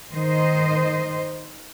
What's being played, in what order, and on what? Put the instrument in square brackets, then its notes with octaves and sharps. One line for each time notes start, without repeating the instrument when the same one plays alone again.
[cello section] D#3 C5 D#5